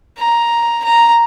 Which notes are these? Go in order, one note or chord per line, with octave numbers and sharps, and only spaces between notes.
A#5
A#5